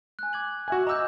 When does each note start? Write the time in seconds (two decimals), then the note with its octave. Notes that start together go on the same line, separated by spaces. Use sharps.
0.19 G#5 F#6
0.33 D6 G#6 F#7
0.68 F#4 E5 G#5
0.87 D#5 A#5 D6 E6 G6